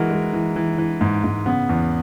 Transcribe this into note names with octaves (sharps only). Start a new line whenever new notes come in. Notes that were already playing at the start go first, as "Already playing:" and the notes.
Already playing: E3 G#3 F#4 A#4
G#3
E3
E3
E3
G#2
G#2
C#3 B3
E2